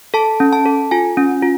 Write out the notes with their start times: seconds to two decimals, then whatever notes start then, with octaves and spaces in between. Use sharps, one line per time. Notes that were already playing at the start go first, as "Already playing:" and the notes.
0.14 A4 A5
0.40 C#4
0.53 A5
0.66 A4
0.91 F4 G#5
1.17 C#4
1.43 F4